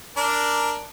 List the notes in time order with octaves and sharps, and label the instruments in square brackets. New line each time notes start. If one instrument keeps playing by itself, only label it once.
[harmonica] D4 A#4